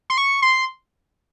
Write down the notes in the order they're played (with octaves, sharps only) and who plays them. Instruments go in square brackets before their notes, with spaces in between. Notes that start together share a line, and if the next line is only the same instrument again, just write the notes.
[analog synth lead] C6
C#6
C6